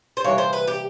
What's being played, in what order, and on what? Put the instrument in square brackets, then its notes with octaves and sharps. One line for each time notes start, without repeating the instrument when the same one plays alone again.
[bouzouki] C5
[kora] C3 E3 G3 A#3 [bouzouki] C#5
[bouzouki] C5
B4
G4